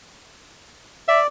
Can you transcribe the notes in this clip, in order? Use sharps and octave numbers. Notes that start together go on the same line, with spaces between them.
D5 E5